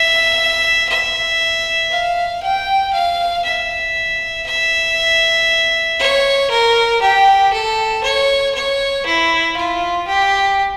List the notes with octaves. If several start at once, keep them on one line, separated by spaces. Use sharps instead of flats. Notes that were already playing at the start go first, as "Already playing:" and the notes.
Already playing: E5
E5
F5
G5
F5
E5
E5
C#5
A#4
G4
A4
C#5
C#5
E4
F4
G4